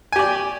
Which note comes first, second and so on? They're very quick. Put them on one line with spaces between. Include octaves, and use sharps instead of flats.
G#5 G4 D5